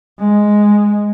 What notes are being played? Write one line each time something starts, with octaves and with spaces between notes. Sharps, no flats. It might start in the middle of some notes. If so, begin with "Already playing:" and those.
G#3